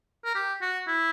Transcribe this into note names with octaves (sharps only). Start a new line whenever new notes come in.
A#4
G4
F#4
E4